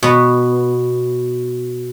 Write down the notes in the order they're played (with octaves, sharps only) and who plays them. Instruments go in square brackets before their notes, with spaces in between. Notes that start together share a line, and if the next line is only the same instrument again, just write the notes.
[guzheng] B2 B3